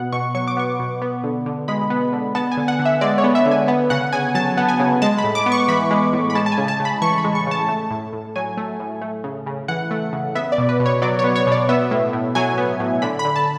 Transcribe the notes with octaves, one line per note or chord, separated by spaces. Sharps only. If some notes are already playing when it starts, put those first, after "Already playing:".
Already playing: B2 B3 F#5
B2 C#6
F#3 C#6
D6
B3 C#6
B2
B3
D3
D3
G#3 B5
B3
D3
B3 A5
G#5
D3
F#5
D3
E5
G#3 D5
C#5
B3
E5
D3
G#5
B3
C#3 F#5
C#3 G#5
F#3 A5
B3
G#5
C#3
G#3 A5
B5
A2
D6
B3
C#6
E3 B5
G#3
A2
B5
G#3 A5
A5
G#5
C#3
A5
C#3
B5
E3 C#6
B5
G#3
C#6
C#3 A5
A3
A2
A2
F#3 G#5
A3
A2
A3
C#3
C#3
E3 F#5
A3
C#3
B3 E5
D5
B2
B4
B2
C#5
F#3 D5
C#5
B3
C#5
B2
D5
B3 E5
A2
A2
F#3 G#5
B3
A2
D3 B5
B5
D3
A5